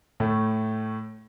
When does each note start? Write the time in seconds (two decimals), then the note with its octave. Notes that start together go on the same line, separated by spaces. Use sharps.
0.20 A2 A3